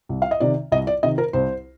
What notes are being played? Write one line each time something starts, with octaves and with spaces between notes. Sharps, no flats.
C2
F5
D#5
C3 D#3 D5
C2 D#5
D5
C3 D#3 D#5
A#4
C2 C5